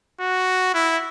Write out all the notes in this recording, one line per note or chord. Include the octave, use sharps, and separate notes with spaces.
F#4
E4